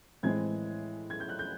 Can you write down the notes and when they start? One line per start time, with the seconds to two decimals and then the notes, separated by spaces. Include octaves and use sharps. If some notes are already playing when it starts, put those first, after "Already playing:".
0.23 A2 E3 G#3 C4 E4 G#6
1.10 G#6
1.20 G6
1.29 F#6
1.39 G6